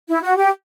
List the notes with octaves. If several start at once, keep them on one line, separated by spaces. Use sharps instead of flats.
E4
F#4
G4